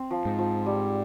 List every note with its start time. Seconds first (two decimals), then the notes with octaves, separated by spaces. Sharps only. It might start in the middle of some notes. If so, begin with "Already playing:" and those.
Already playing: C4
0.11 F3
0.25 G#2
0.38 F3
0.66 G3